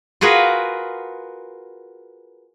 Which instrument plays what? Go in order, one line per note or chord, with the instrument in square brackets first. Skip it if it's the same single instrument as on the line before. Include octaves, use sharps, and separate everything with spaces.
[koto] F4 F#4 G#4 A#4 B4